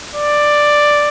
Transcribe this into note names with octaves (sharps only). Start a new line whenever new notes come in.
D5